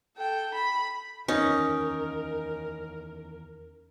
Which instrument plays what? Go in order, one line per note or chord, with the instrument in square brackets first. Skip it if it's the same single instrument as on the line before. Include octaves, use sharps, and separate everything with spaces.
[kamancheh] A4 G5
B5
[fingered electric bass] E2 D#3 [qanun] C#4 D#4 [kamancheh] A#4